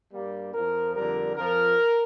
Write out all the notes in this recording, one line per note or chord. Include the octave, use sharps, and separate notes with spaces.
G2 G3 A#3
F2 F3 A#4
F2 D3 G3 A#4
F2 F3 A#4